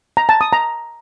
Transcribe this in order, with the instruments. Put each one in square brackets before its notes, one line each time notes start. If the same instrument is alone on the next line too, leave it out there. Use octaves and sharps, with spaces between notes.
[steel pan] A#5
A5
D#6
A#5